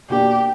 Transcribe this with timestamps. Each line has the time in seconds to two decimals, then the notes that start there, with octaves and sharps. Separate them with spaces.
0.09 B2 A#3 D4 G4